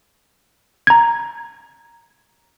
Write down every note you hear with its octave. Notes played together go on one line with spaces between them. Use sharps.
A#5 G#6